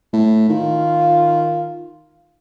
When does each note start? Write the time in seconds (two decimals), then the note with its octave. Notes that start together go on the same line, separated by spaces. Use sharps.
0.13 A2
0.49 D#3 F4